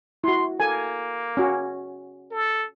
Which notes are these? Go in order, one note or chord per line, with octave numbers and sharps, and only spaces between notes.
E4 F#4 C6
A#3 A4 G#5
C#4 F#4
A4